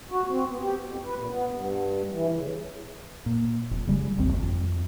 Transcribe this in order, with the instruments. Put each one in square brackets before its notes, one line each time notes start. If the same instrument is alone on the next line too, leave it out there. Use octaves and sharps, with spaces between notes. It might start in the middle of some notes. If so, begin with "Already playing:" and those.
[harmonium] F#4
C4
B3
G4
F2
B4
A#2
B3
G2
E3
C#3
[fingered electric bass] A#2
F1
C#3 G3 G#3
G#1 D#2 C4
F2